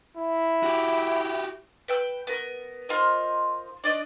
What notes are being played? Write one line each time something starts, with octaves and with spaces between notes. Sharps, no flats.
E4
F#4 G4
B4 G5 E6
B3 A#4
F4 A#4 C5 D#5
D4 D5 D#5